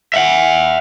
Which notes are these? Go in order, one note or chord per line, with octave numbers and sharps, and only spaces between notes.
E5 F#5